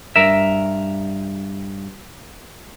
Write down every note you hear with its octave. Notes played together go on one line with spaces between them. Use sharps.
G2 A#4 E5